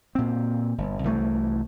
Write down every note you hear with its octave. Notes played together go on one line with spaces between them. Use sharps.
A#2 C4
G1
C2 E3 A3